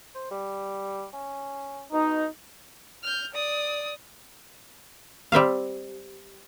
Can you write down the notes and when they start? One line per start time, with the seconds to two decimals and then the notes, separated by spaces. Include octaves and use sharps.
0.15 C5
0.31 G3
1.14 C#4
1.92 B2 D#4
3.04 F6 G6
3.33 D5 D#6
5.32 G3 C4 E5 F5